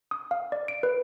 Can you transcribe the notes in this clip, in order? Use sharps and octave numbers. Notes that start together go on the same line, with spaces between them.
D#6
F5
D5
D7
B4